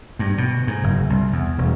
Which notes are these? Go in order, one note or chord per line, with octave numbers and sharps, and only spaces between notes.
G2
B2
G#2
F#1
C2
E2
E1